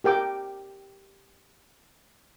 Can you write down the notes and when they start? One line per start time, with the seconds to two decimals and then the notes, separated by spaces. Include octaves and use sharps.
0.04 G4 A#4 G5 D6